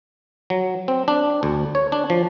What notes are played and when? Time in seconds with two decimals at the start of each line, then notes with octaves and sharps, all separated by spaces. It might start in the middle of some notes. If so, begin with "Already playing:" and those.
0.50 F#3
0.88 C4
1.08 D4
1.43 D2
1.75 C#5
1.92 D4
2.10 F3